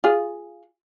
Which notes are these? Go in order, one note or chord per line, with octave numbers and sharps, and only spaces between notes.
F4 G#4